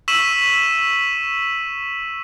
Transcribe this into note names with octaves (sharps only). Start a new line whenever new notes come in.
C#6 E6 B6 D#7 E7 F#7